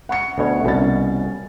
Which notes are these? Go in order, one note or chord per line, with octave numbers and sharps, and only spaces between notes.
F#5 C#6 C#7
D2 B2 C#5
C2 B2 C#4 A6